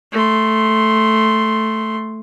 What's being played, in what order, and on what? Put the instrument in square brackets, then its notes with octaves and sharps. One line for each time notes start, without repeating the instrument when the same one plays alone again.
[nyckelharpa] A3 C6